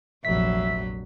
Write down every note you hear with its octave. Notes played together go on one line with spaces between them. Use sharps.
F1 A#1 F#3 E5 B6